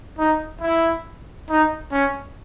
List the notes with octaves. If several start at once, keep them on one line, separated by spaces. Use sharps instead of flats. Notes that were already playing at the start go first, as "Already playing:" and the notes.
D#4
E4
D#4
C#4